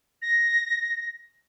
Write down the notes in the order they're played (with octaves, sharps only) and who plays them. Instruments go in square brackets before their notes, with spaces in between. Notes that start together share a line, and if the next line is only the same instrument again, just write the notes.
[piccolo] A#6